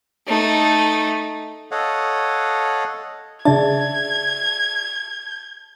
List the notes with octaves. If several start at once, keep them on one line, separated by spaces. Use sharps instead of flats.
A3 D#4
A4 C#5 D#5 F5 F#5
C#3 D4 G#4 D5 E5 A5 G#6